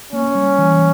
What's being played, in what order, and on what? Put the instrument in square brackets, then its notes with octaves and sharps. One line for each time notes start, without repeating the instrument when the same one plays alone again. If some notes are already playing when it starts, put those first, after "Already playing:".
[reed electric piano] A#3 [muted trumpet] C#4
[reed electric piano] G3
E3